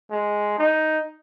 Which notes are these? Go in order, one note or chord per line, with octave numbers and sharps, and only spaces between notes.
G#3
D#4